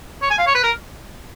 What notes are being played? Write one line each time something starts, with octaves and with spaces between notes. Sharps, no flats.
C#5
G#5
F5
C#5
B4
A#4